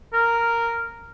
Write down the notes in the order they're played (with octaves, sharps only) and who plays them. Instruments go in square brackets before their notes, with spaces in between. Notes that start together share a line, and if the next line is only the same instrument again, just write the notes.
[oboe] A#4